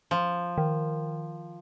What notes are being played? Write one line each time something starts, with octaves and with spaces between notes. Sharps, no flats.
F3
D#3